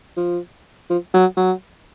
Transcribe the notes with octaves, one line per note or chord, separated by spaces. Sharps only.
F3
F3
F#3
F#3